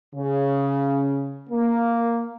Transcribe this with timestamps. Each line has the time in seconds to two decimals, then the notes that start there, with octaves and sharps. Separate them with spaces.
0.15 C#3
1.50 A#3